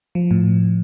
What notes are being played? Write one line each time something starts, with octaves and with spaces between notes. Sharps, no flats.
F3
A2